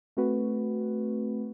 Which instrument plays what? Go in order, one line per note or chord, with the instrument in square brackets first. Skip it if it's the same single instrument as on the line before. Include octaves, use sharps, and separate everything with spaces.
[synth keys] A3 C4 F#4 B4